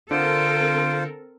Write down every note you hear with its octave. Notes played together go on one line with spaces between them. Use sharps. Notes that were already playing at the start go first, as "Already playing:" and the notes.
D3 C4 F4 A4 A#4 C5 D7